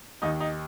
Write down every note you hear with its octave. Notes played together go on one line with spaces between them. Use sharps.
D#2 D#3 D#4
D#4